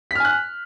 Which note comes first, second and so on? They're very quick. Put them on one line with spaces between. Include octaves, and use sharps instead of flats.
B6 F6 G#5 F#6